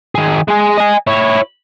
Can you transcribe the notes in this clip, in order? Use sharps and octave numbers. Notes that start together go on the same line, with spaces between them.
D#3 G#4
G#3 G#4
D#5 G#5
E4 C#5